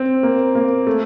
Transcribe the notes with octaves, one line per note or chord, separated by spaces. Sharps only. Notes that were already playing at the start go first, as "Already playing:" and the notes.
Already playing: C4
A#3
A#3
A3